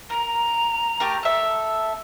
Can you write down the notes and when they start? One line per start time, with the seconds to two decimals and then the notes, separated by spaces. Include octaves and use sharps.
0.10 A#4 A#5
1.00 A3 G4 A#4
1.23 A4 E5